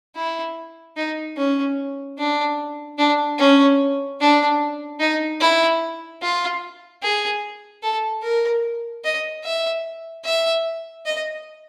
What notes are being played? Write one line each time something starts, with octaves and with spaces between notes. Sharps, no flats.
E4
D#4
C#4
D4
D4
C#4
D4
D#4
E4
F4
G#4
A4
A#4
D#5
E5
E5
D#5